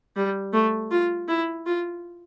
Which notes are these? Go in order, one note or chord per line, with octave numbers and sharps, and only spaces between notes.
G3
A3
F4
E4
F4